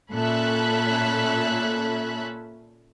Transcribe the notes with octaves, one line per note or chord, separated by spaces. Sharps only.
A#2 C#4 A4 E5 B5 F#6